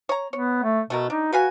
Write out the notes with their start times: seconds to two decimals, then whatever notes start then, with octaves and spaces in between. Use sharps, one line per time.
0.09 C#5 A#5
0.33 B3 C#5
0.63 A3
0.90 B2 A3 B3 A#4
1.10 D4 D#4
1.32 F#4 B4 F5 G#5